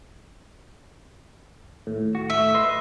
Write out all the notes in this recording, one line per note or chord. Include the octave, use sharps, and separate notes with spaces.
D#2 A2
F#4
A3 E5
B4 D#5 C6